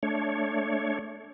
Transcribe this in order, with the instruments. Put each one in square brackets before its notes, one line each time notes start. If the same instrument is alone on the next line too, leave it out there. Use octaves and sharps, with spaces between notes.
[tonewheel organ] A3 D4 C#5